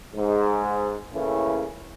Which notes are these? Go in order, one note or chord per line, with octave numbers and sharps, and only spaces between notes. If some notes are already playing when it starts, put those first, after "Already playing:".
G#2
A2 C#3 E3 A3 A#3 C#4